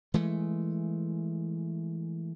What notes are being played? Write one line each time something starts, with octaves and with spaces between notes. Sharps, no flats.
E3 G#3 A3